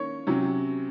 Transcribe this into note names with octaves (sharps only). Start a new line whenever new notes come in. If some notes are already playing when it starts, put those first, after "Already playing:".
Already playing: D#3 A#3 C#4 C#5
C3 F#3 C#4